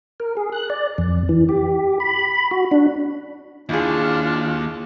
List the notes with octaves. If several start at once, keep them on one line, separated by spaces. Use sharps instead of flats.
A#4
G#4
F#6
D5
F2
E3
G4
B5
F#4
D4
D#2 D4 E4 F4 G#4